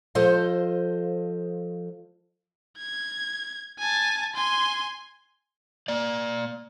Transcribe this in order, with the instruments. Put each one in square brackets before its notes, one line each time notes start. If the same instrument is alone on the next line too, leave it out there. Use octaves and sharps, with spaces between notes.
[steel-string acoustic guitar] F3 A4 C5 D#5 F5
[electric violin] G#6
G#5 A5
G#5 C6
[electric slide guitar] A#3 D5